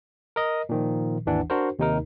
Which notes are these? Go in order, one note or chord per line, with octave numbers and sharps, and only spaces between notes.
A#4 D#5
A#2 D#3 F3
G#1 D#2 E3 D4 F#5
D4 F#4 A#4 C5
D#2 C3 D#4 A#4